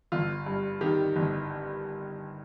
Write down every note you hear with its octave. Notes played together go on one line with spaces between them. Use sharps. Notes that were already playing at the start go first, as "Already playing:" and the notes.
G1 F4
G2
D#3 G4
G1